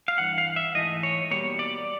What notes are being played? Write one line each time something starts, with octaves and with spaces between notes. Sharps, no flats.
F5
G2 E3 F#5
F5
E5
G#2 E3 A3 D#5
C#5
B2 G3 A#3 C#5
D5